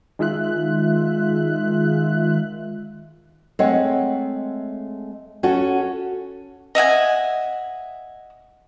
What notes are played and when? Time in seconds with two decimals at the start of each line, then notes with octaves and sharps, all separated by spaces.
0.19 D#3 G#3 F4 E5 F#6
3.59 G#3 A3 C4 C#5 F#5
5.43 C#4 F#4 A4 F#5
6.75 D#5 E5 F#5 G#5